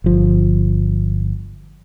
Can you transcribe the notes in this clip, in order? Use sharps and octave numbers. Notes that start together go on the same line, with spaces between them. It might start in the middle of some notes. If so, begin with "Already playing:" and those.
G1 F3